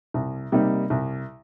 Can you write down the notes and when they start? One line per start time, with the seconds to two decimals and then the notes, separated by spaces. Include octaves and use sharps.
0.14 C2
0.52 C3 G3 A#3 D#4
0.90 C2